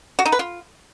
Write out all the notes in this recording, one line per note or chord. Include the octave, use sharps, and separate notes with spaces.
F#4
D#4
B4
F4